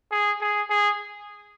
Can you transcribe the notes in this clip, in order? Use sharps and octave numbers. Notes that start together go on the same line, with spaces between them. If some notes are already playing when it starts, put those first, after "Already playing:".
G#4
G#4
G#4